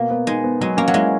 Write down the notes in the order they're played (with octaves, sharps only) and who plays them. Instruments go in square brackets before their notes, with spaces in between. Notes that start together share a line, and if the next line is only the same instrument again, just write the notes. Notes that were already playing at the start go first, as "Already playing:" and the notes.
Already playing: [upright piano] B2 [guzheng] A#3
[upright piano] B3
[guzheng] G#3 [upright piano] D#4
[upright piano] B3
[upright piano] F#3 [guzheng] G#3
[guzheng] A#3 [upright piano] C#4
[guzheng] F#3
[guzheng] G#3 [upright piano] E4